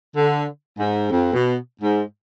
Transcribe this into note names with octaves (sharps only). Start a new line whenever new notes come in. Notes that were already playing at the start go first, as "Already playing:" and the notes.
D3
G#2
F2
B2
G#2